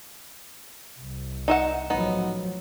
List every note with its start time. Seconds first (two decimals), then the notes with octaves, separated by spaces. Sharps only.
0.99 C2
1.48 D#4 E5 F#5
1.90 A1 F3 F#3 B3 D#4